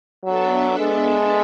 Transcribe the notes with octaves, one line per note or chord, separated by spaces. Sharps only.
F#3 B3 D4 A4 E5
G#3